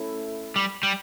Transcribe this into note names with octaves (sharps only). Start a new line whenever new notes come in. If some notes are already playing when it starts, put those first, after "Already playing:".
Already playing: A3 C#4 E4 A4
G3
G3